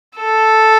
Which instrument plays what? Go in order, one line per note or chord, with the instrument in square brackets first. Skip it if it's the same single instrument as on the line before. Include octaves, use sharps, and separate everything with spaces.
[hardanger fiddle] A4